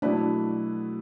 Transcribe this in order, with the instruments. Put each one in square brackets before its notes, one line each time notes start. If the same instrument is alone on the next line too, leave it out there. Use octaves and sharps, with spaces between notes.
[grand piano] B2 F#3 A3 E4 B4 [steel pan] D4